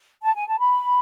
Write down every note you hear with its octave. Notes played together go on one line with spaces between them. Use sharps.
A5
G#5
A5
B5